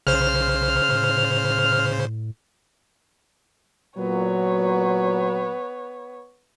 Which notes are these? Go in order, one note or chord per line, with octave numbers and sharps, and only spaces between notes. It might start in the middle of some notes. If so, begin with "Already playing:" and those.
B1 C#3 C5 F6
A2
A#2 F#3 B3 C#5